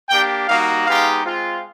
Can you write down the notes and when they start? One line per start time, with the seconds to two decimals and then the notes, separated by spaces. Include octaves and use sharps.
0.09 A#3 D4 G4 G5
0.48 G3 A#3 D#4 F#4 F5
0.86 G#3 B3 D#4 G4 F5
1.25 G#3 C4 F4